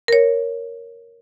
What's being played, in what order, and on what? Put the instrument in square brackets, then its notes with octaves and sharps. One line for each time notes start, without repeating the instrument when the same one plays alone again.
[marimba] A#4 C#5